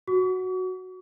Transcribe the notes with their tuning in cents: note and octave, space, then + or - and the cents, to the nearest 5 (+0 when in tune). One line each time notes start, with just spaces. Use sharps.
F#4 +0 C#6 +45